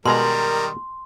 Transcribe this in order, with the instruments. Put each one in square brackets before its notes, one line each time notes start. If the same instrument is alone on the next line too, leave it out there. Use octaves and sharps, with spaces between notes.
[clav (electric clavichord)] B2 G#3 A#5 [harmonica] D#3 G3 [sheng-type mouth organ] A#4 [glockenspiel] C6